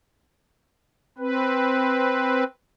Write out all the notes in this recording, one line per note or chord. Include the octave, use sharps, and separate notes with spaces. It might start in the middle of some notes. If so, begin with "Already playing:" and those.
C4 B4